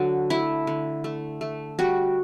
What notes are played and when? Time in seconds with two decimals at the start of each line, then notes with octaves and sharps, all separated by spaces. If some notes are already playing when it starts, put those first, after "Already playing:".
Already playing: D3 F#3 F#4
0.30 A3 E4
0.67 D3
1.04 A3
1.41 A3
1.79 G3 F#4